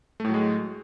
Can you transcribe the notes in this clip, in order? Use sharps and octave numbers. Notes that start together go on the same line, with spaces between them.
A2 F#3 G#3 A3